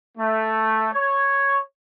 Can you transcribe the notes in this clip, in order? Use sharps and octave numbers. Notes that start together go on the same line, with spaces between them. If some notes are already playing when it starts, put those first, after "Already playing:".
A3
C#5